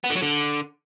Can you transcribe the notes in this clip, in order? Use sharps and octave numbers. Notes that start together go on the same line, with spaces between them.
B3
D3
F#3
D3